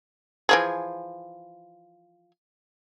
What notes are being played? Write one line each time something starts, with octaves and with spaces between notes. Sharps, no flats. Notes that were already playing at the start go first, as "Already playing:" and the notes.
E3 F3 G#4